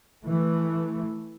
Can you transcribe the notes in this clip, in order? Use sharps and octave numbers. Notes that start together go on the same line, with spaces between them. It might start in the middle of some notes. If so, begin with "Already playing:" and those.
E3 A3